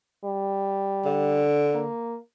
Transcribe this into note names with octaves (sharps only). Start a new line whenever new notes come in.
G3
D3
A#3